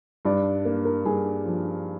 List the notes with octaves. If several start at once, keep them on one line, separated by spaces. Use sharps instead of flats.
G2 D5
A#3
A#4
G2 G#4
F3